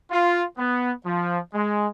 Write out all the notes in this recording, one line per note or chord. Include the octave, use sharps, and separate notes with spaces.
F4
B3
F3
G#3